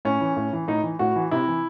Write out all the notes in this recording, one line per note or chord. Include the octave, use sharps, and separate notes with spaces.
A2 C#4
E3
A2
E3
A2 D#4
E3
A2 F#4
E3
C3 E4
E3